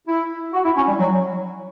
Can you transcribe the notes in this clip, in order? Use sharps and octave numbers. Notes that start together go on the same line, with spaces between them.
E4
F#4
E4
C#4
G3
F#3